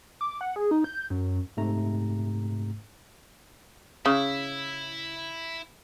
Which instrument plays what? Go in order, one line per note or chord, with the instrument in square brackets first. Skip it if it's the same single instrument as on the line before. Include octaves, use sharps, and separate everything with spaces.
[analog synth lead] D6
F#5
G#4
D#4
G6
F#2
[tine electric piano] G#2 C3 A3 A#5
[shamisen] C#3 [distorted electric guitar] E4